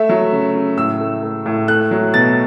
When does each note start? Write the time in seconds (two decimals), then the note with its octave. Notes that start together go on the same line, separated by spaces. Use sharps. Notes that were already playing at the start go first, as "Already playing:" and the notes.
Already playing: A3 E5
0.09 F#3
0.32 C#3
0.55 C#3
0.77 A2 E6
1.00 A3
1.23 A3
1.46 A2
1.68 A3 F#6
1.91 F#3
2.14 B2 A6